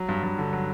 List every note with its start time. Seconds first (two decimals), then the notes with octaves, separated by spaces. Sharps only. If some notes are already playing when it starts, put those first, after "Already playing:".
Already playing: F#3
0.09 G2
0.23 G2
0.38 D3
0.53 F#3